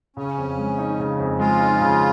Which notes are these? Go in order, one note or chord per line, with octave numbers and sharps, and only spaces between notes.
C#3 C#4
F2
G#3
D#4
C#3
F2
G#3 F4
D#4
C#3